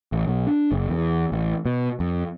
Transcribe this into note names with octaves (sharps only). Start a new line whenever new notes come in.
A1
B1
D4
F#1
E2
A1
B2
F2